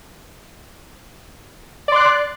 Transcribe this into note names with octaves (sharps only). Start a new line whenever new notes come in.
D5 C6 F#6